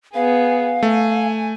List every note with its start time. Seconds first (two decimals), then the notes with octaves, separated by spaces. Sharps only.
0.14 B3 G#4 F5
0.83 A3 G#5